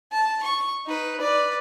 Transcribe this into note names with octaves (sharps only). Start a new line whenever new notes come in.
A5
C#6
D#4 B4
B4 D5